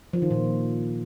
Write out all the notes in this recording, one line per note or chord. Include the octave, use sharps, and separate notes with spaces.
F3
D#3
A#2